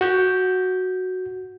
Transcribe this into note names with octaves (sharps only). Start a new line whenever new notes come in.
F#4 G6